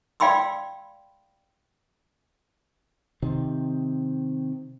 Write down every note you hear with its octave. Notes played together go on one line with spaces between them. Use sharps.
D5 F5 G5 B5 C6 E6
C3 D#3 C4